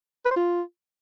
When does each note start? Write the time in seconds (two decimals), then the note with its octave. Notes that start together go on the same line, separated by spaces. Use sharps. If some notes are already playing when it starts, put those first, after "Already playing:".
0.25 B4
0.31 C5
0.36 F4